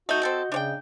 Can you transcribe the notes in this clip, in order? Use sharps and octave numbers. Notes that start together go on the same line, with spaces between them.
A3 D#4 F#4 D#5 G6
C4 A4
C#3 D4 C#5 G5